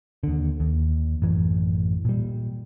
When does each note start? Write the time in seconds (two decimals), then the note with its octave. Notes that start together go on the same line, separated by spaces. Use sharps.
0.23 D#2 D3
0.60 D#2
1.22 A1 F#2 E3
2.05 A#2 G3